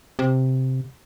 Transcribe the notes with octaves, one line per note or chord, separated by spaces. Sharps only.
C3